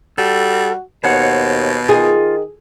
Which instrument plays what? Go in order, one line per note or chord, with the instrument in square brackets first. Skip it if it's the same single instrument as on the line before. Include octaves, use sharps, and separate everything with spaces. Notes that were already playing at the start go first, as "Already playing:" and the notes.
[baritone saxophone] G3 [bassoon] F#4 [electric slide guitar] A4
[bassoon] D#2 [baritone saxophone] B2 [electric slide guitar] C5 C#5 F#5
[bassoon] D#3 [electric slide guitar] F4 [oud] G#4